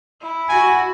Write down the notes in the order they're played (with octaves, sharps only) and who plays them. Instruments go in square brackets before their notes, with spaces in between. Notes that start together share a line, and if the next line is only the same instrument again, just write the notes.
[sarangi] E4
[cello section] F#4 [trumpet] G#5